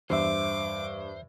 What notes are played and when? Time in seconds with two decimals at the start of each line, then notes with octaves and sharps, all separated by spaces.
0.10 E2 G2 C5 E5 D6